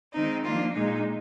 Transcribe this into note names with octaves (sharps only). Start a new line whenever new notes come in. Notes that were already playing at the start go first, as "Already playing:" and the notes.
D#3 G#3 C4 D#4
F3 A#3 D4 F4
A#2 G#3 D#4